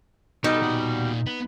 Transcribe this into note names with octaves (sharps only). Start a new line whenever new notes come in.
B2 G3 D#4 A4 A#4
A#2 F#5
B3